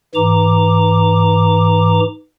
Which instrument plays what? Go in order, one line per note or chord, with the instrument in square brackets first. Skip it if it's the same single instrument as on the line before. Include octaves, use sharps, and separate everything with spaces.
[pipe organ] G#2 E3 A#5 D6